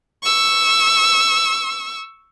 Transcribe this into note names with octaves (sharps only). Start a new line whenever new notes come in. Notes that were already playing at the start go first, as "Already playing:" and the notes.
C#6 E6